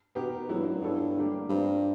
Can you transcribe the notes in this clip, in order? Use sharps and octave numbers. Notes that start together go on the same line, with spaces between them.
B2 B3 D#4 G4 A#4
G#2 F#3 B3 E4
G2
F#2
G2
B3 E4 A4 C#5
D3 G3 A#3 D4 G4
G2 G3 C4 F4 A#4